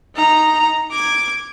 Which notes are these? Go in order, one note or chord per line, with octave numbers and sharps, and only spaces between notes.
D#4 A#5
D6 G#6